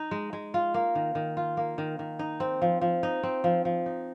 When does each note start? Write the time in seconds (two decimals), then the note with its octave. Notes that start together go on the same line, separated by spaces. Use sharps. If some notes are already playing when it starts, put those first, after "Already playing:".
Already playing: D#4
0.11 G#3
0.33 G#3
0.54 F4
0.74 A#3
0.95 D#3
1.15 D#3
1.37 F4
1.57 A#3
1.78 D#3
1.99 D#3
2.19 D#4
2.40 C4
2.62 F3
2.81 F3
3.03 D#4
3.23 C4
3.44 F3
3.65 F3
3.86 D#4